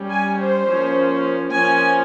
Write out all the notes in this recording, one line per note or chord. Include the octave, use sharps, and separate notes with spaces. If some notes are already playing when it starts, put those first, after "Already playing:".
Already playing: G3 C#4
G#5
C5
F3 A#3 C#4
F3 A#3 C#4 G#5